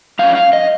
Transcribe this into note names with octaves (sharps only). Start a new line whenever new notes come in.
F3 A#3 C#4 F5
F5
D#5